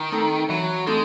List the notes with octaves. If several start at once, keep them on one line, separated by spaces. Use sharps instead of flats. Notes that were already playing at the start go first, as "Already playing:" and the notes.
Already playing: D#3
A3 C4 D#4 A4
E3 F#3
G#3 A3 C4 D#4 A4